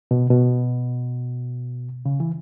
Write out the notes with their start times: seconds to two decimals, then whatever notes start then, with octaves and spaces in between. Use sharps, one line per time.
0.11 B2
0.30 B2
2.06 C#3
2.20 E3